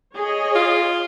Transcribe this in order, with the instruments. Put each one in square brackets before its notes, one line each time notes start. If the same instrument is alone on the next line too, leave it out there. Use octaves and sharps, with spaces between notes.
[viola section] G#4 C#5 D#5
[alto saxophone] F4